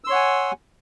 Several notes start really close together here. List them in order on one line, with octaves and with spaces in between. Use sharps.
E6 C6 C#5 F#5 G#5